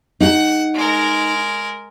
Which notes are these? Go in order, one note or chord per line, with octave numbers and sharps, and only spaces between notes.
D#4 G#4 F#5
G#3 A#4